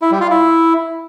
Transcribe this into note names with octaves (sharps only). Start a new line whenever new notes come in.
E4
G3
F4
E4